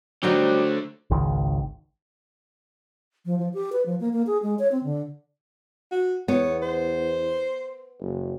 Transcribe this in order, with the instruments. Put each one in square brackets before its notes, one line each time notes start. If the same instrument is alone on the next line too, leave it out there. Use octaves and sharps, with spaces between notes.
[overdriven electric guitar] D3 A3 [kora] F#3 D#4 F#4 [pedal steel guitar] G3 [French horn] C5
[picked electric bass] G#1 C#2 D#3
[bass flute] F3
F3
G4
B4
F3
A#3
A#3
G#4
G#3
C#5
C4
D3
[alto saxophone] F#4
[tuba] E2 [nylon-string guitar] B3 [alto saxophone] C#5
[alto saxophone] C5
[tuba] F#1